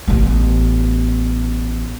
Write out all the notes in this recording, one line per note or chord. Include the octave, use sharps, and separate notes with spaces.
A1 B3